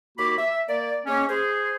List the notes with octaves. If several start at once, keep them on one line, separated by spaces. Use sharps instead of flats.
D#2 A#3 F#4 B5 D6
E5
A#3 D5
G#3 A#3 C#4
G#4 C5